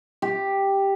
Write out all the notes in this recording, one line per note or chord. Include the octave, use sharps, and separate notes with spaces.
G4